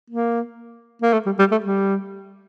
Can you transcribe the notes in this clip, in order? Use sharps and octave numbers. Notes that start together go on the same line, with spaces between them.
A#3
A#3
A3
G3
G3
A3
G3